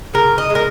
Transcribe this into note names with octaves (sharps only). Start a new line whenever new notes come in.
C#3 A#4
D#5
G#3
A#4